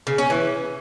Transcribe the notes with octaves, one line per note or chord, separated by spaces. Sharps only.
C#3
C#4
E3